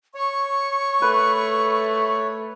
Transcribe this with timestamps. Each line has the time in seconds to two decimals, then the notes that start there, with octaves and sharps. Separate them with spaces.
0.15 C#5 C#6
1.02 A3 B4